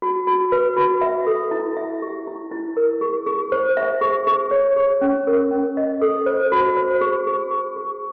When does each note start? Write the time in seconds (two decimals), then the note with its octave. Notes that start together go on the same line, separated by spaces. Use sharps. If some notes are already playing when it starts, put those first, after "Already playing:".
0.02 F#4
0.27 F#4
0.52 B4
0.77 F#4
1.01 E5
1.27 A4
1.51 E4
1.77 E5
2.02 G4
2.27 E4
2.51 E4
2.77 A#4
3.01 G#4
3.26 G#4
3.52 C5
3.77 E5
4.01 G#4
4.27 G#4
4.51 C#5
4.76 G#4
5.01 C#4
5.27 A#4
5.51 C#4
5.77 D#5
6.02 A4
6.26 C5
6.52 F#4
6.77 C5
7.01 G#4
7.27 G#4
7.51 G#4
7.76 G#4